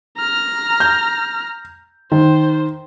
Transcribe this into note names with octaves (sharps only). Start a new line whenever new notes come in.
A#5 F6
G6
D#3 C5